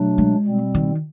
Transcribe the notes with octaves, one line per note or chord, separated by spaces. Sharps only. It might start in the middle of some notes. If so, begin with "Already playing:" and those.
Already playing: B2 F#3 A3 D4
G#3
B2 G3 C4
D#3